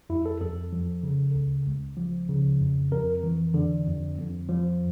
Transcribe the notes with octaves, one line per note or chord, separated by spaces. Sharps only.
F2 E4
A4
F2 A4
F3
C#3
C#2
C#2
F3
C#3
F2
F2 A#4
E3
D3
F2
F2
F3